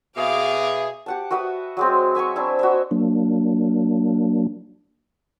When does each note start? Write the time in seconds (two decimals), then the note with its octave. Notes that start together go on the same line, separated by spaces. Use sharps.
0.16 B2 G#4 E5 F5 D6
1.06 G4 F#5 A5
1.31 F#4 B4 E5 D#6
1.77 F#3 G#3 C4
2.15 E5 G#5 A#5 C#6
2.36 C4 D4 E4
2.59 F#4 D#5 E5
2.91 F#3 A#3 D4